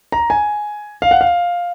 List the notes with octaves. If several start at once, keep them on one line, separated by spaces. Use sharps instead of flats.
A#5
G#5
F5
F#5
F5